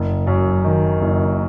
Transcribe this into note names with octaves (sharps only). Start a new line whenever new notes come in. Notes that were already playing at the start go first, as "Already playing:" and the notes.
Already playing: F#1
F#2
D#3
F#1